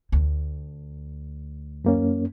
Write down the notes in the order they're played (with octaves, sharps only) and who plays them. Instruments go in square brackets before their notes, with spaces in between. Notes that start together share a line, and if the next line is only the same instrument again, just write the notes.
[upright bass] D2
[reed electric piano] F#2 A#3 C#4